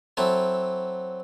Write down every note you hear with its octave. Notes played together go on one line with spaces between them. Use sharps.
F#3 C4 E4 A4 E5